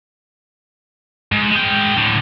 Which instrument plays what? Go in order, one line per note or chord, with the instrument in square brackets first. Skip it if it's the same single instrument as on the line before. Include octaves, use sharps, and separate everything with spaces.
[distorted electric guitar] G#2
G#3 G5
A2 D3